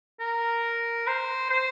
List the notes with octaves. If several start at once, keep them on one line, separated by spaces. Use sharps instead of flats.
A#4
C5
C5